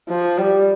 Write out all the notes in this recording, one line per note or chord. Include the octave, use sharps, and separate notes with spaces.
F3
G3